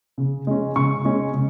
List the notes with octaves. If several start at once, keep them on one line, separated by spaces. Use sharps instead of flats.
C#3
G#3 C#4
C#3 C#6
G#3 C#4
C#3